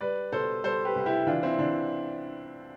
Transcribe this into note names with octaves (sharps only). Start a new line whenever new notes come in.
G3 B4 D5
B2 A4 C5
G3 A4 C5
G4 B4
C2
E4 G4
E3 D4 F4
C4 E4
E3 D4